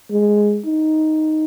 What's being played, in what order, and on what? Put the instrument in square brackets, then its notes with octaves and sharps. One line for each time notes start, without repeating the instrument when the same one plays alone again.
[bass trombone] G#3
D#4